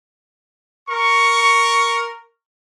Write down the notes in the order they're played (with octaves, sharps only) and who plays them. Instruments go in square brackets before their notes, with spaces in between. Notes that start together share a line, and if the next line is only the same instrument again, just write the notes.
[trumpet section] A#4 C#6